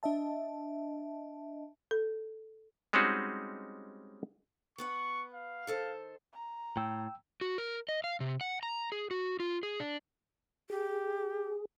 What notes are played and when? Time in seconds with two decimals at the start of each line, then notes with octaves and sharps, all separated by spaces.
0.03 D4 D#5 E5 A5
1.91 A4
2.93 G3 G#3 C4 C#4 D#4 F#4
4.78 B3 B4 F#5 C#6
5.34 F5
5.67 D#3 A4 C5
6.33 A#5
6.77 A2 G5 E6
7.41 F#4
7.58 A#4
7.89 D#5
8.04 F5
8.20 C3
8.41 F#5
8.63 A#5
8.92 G#4
9.11 F#4
9.40 F4
9.63 G#4
9.80 D4
10.70 G4 G#4